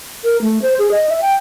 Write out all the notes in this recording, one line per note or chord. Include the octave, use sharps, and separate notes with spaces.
A#4
A3
C5
G#4
D#5
E5
G5